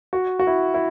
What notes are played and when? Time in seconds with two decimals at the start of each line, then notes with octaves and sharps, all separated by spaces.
0.13 F#4
0.39 F#4
0.47 E4
0.74 E4